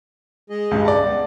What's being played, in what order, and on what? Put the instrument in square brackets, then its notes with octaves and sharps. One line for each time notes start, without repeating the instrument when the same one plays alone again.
[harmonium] G#3 G#4 D#5
[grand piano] C#2 G2
D5 A5
[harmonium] B3